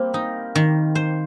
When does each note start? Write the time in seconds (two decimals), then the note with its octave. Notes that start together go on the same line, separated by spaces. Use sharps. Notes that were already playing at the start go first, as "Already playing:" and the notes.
Already playing: G3 A#3 C4
0.14 D#4
0.55 D#3
0.95 C5